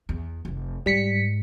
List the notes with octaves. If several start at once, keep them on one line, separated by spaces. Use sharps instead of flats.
E2
F1 F3
G#2 G3 B6 C#7